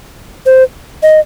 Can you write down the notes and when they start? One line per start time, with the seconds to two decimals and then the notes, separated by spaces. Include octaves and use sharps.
0.46 C5
1.03 D#5